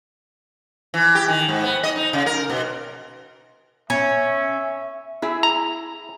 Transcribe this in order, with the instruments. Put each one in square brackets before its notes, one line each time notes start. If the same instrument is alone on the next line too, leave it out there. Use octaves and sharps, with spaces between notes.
[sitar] E3
G4
D#3
G#2
B3
D#5
D#4
C#3
A#4
B2
[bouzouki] C#4 [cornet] E5
[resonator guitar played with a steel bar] E4 G#4 E5
[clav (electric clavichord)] A#5